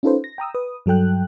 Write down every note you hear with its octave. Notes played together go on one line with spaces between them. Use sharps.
C#4 D#4 F4 A4 B4 C5
A#6
G5 A#5 D#6 E6
B4 D#6
G2 F#3 A4 G5 F#6